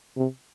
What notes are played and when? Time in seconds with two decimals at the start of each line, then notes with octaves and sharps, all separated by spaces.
0.16 C3